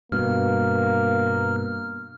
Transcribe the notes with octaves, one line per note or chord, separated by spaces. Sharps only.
G2 B2 A#3 F6